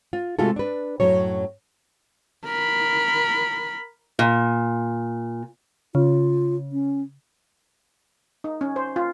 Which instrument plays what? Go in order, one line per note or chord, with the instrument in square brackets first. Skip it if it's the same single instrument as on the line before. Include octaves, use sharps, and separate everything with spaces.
[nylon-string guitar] F4
C3 G#3 A3 F4 F#4 A4
D4 B4
F#2 A2 C3 F#3 C#5
[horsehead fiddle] A#4 B5
[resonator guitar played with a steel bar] A#2
[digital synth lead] C#3 [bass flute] F4
[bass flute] C#4
[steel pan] D#4
C#4
C5
F4